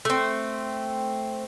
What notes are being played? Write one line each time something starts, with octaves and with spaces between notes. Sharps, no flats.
A3 C4